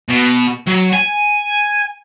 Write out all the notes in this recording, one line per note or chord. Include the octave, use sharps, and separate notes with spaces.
B2
F#3
G#5